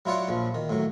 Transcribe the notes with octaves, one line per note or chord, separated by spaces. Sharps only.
F#3 E4 F4 C#5 D5 F#5
A#1 F3
D#3
A2 F#3